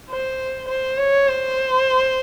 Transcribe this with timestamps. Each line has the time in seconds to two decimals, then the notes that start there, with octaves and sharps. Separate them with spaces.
0.11 C5
0.69 C5
0.98 C#5
1.28 C5